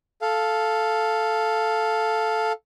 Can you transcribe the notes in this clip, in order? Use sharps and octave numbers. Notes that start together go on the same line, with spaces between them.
A4 F5